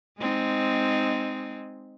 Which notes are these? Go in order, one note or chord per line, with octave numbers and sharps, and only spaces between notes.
G#3 C4 D#4